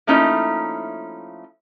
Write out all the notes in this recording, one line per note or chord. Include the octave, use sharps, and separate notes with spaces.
F3 A3 A#3 C#4 D#4 E4